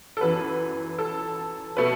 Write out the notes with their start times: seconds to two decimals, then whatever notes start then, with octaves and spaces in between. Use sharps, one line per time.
0.17 A4
0.21 F#2 E3 B3 B4
0.98 A4
1.77 B2 A3 B4